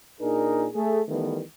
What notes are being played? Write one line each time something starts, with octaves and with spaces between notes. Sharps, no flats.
A#2 D4 D#4 G#4 A#4
A3 G#4
D#3 E3 G3 A3 B3